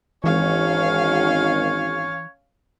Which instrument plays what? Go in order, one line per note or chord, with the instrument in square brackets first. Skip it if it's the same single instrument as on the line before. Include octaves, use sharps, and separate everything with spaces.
[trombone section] G#1 [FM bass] E3 [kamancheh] C#4 F5 [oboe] C#5